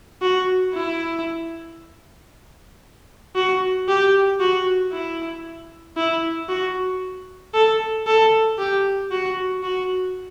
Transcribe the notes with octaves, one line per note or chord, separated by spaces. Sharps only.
F#4
E4
F#4
G4
F#4
E4
E4
F#4
A4
A4
G4
F#4
F#4